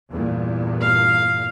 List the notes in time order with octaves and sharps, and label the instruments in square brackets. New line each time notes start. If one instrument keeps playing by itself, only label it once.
[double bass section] E2 G2 A#2
[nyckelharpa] F5